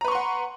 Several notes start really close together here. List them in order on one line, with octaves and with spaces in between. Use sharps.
A#5 B4 C#6 C6 F#5